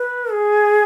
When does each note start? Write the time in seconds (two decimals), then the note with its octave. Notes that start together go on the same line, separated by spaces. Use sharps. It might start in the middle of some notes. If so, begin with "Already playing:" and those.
Already playing: B4
0.32 G#4